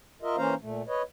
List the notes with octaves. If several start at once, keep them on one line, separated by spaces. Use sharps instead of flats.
F4 A#4 D#5 E5
E3 A#3 C#4 C5 F5 A#5
A#2 A3
B4 C#5 D#5